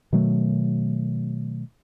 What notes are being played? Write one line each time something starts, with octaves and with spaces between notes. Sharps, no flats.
B2 D#3 F#3 A3